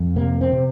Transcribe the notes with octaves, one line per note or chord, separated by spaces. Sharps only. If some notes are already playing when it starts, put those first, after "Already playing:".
Already playing: F2
C3 A#3
C4
C3